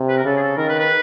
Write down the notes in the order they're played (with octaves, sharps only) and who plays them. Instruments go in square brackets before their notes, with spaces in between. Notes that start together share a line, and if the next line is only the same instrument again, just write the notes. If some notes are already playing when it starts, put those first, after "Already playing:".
Already playing: [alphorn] C3
[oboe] B4
A#4
[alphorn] C#3 [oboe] A4
[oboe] G#4
A4
[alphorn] D#3 [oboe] A#4
[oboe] B4
B4